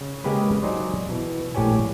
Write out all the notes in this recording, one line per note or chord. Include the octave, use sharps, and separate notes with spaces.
C#3
C#3 G#3 A#3 G4 G#4 B4
F#3 D#4 G#4 C5 D5
B2 E3
A#1 A2 G4 C#5 G#5